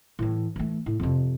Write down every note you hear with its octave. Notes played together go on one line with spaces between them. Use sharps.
A2 E3
E3 A3
A2
F2 C3